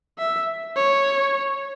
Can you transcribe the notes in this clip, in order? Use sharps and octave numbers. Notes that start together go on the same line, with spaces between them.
E5
C#5